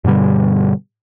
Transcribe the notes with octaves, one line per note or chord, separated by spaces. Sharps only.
G2 B2 D3 G3